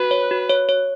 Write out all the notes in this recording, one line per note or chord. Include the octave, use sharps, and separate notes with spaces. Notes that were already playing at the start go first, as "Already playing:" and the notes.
Already playing: F#4 B4
C#5
F#4
C#5
C#5